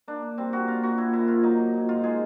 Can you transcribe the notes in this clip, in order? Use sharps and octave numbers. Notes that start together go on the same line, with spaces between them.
A#3 D4
A#3
G3 C4
A#3 F#4
A#2 F4
A#3 F#4
A#2 E4
A#2 E4
A#2 F4
F#3 D#4
F#3
A#2
G#2 F4
G#3 G#4